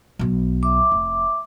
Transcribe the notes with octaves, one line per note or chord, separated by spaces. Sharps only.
B1 B3
E5 D6
F1